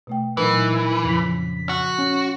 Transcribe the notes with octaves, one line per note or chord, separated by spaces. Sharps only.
B2 A3 G5
A#2 E3 F#3 D#4 A#4 B4
F2 C#3 F3 B6
F#4
C#4